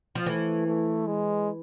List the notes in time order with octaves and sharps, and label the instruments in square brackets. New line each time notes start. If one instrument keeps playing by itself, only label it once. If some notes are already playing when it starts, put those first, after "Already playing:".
[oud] F3
[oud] E3 [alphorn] A3
[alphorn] A3
G#3